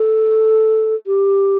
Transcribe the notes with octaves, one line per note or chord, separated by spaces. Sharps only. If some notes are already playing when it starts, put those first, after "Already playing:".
Already playing: A4
G4